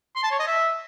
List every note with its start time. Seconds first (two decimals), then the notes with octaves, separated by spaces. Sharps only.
0.16 C6
0.24 A5
0.31 C#5
0.39 D#5
0.47 E5